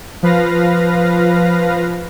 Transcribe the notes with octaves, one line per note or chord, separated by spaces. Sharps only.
F3 B4 F5 A#6